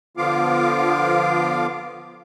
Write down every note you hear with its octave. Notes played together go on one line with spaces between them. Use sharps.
D3 F3 B3 F4 F5 D6